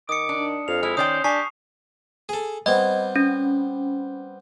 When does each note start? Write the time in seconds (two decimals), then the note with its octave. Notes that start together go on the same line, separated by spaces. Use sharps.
0.09 D#3 D6 D#6 C#7
0.29 D4
0.68 F2 F5 F7
0.83 G#3 E4 F6
0.97 D#3 C#4 C5 D5 G5 D#6
1.24 D4 G4 G#5 A5 C#6 C7
2.29 G#4 A4
2.66 G3 B3 C4 D#5
3.16 C#4